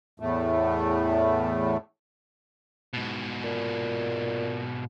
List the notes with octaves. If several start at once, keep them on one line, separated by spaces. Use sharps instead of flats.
E2 A2 A3
G#2 B2
A#2